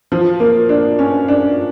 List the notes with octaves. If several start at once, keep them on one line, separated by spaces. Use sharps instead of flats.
F3
A#3
D4
C#4
D4